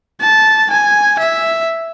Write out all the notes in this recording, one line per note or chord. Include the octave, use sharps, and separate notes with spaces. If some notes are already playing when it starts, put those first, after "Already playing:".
A5
G#5
E5